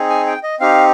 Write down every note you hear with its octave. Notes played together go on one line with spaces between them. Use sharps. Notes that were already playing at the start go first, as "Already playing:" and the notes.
Already playing: C4 D#4 G#4
G#5
G5
D#5
C4 D#4 G4 F5